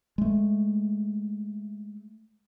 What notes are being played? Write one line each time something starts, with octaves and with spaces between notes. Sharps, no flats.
G#3 A3